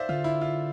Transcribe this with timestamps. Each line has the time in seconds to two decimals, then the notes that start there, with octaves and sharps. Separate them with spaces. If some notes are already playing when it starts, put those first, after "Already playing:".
Already playing: C5 D5 E5 F5
0.09 D3 F4
0.24 E4
0.41 F4